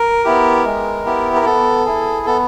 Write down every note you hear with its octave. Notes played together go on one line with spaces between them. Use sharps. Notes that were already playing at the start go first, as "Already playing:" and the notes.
Already playing: A#4
B3 E4 G4
G#3
B3 E4 G4
A#4
B3 A4
E4 G#4
B3 A4